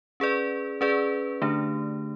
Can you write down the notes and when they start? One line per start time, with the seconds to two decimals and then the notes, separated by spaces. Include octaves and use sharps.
0.20 C#4 G#4 B4 D5
0.81 C#4 G#4 B4 D5
1.42 D3 A3 D4